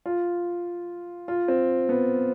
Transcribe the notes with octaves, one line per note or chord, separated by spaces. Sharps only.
F4
F4
C4
B3